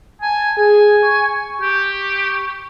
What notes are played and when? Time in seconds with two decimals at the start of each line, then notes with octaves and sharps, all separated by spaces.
0.22 G#5 A5
0.57 G#4 G#5
1.03 C#6
1.61 G4